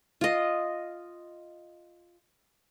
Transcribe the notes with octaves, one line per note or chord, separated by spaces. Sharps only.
F4 D#5